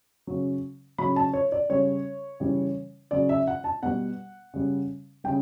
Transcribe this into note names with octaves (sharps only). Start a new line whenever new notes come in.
C#3 F#3
C#3 F#3 B5
A5
C#5
D5
C#3 G3 C#5
C#3 E3 G3
C#3 F#3 D5
E5
F#5
A5
B2 G3 F#5
C#3 G3
C#3 G3 G5